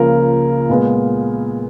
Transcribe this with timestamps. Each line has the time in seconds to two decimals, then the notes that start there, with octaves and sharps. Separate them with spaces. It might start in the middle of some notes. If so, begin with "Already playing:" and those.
Already playing: C#2 C#3 F3 A#3 A#4
0.69 A#2 G#3 B3